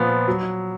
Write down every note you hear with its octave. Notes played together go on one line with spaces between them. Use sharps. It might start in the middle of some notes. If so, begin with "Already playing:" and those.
Already playing: A#2 F3 B3
F#3